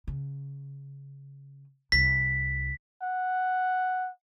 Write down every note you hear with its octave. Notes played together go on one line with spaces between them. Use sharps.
C#3
C2 B6
F#5